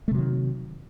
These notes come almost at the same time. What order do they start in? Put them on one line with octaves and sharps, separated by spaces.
A3 C3 F#3 D#3